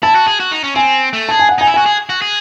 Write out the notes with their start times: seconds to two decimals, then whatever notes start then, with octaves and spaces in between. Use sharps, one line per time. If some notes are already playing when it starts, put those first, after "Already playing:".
0.03 E4 A5
0.15 F#4
0.27 G#4
0.40 F#4
0.51 D#4
0.64 C#4
0.75 C4 G#5
1.13 A3
1.29 G#4 A5
1.39 G#5
1.49 F#5
1.58 D#4 G#5
1.67 E4
1.74 F#4 G#5
1.86 G#4
2.09 F#4
2.22 G#4